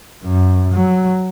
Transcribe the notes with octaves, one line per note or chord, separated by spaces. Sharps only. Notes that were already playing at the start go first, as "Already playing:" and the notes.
F#2
F#3